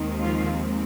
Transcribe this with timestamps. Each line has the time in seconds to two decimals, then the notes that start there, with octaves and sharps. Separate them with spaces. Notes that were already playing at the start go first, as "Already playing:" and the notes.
Already playing: D#2 D#3 G#3 C4
0.22 F3 F4